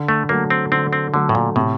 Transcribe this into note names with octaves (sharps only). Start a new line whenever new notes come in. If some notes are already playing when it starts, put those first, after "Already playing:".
Already playing: D3
A3
F#3 A3 A#3
C4
D3 C4
C4
D3 F#3 A3
A2
A#2
A2 C3